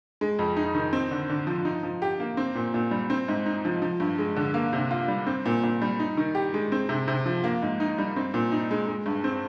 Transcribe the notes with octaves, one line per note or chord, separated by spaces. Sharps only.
G#3
F2
D#4
D#3
C4
D3
D3
F3
D#4
F3
G4
A#3
C4
A#2
A#2
G3
C4
G#2
D#4
F3
F3
G2
G#3
D3
A#3
C3
F4
G3
C4
A#2
A#2
G3
D#4
D#3
G4
G#3
C4
C3
C3
F3
A#3
G#2
D#4
G3
C4
A#2
D#4
G#3
G#3
G2
C4